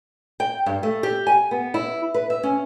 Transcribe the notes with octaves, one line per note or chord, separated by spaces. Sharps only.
G5
G2
A3
G4
G#5
B3
E4
B4
E5
C#4